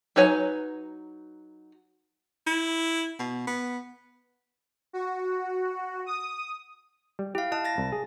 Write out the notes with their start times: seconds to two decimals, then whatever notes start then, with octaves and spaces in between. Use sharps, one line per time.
0.16 F#3 D#4 B4 C#5 G#5
2.47 E4
3.19 B2
3.47 B3
4.93 F#4
6.06 D#6
7.19 G3
7.35 E4 G4 F5
7.52 E4 D#5 F5 A5
7.65 A6 A#6
7.78 C2
7.92 G#4